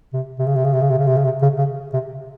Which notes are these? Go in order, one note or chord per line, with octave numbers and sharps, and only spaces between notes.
C3
C3
C#3
C3
C#3
C3
C#3
C3
C#3
C3
C#3
C3
C#3
C#3
C3